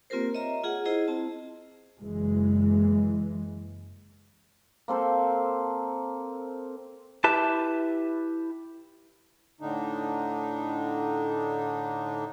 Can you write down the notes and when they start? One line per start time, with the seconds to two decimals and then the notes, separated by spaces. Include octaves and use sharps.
0.10 A#3 C4 F4 G4 A#4 C5
0.34 C#5 D#5 E5 A#5
0.63 F4 G#4 F#5
0.85 E4 G#4 C5 D#5
1.08 C4 A5
2.01 F#1 E3 G#3
4.88 A#3 C4 A4 C5
7.24 E4 G4 B4 E5 A5
9.61 A2 D3 D4 D#4